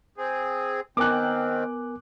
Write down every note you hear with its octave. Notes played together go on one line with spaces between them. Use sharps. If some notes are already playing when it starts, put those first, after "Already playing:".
C4 G#4
D#3 B3 C4 A#4 G#5 D6 F#6